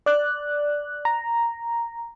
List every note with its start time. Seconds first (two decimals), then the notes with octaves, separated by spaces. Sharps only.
0.06 D5 F#6
1.05 A#5